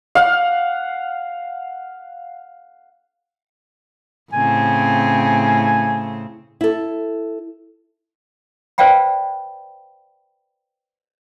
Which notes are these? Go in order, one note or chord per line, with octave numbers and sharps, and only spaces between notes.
F5 F#5
A2 C#3 C4 G#5
E4 A4
B4 C5 D5 F5 G5 B5